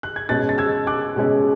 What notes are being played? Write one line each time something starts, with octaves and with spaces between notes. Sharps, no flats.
F#6
G#6
B2 G#3 C#4 F#6 A6
A6
E6 G#6
D6 F#6
B2 G#3 C#4